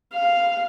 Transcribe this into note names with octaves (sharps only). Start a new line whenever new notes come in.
F5